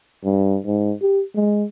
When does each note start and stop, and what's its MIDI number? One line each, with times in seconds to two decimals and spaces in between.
0.25 0.58 43
0.65 0.93 44
1.02 1.23 67
1.35 1.64 56